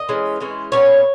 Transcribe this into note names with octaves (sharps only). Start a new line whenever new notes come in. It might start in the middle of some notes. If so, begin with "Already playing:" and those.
Already playing: D#5
E3 G#3 C#4
E3 G#3 C#4
A#2 G3 B3 C#4 C#5